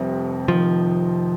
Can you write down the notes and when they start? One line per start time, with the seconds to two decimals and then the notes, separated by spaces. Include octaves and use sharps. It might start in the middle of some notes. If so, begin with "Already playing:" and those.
Already playing: F1 F2 C3 G3 C4
0.48 F1 F2 D#3 F3